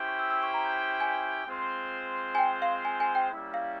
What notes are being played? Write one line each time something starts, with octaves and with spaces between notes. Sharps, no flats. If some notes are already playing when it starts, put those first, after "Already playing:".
Already playing: C#4 E4 G4 C5 G5
C#6
E6
E6
C#6
A#5
G#5
G#3 C4 F4 C5
G#5
G5
F5
G#5
G#5
G5
G3 A#3 C#4 E4
F5